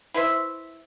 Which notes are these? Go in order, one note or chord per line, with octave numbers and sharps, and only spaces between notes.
E4 B4 C5 E5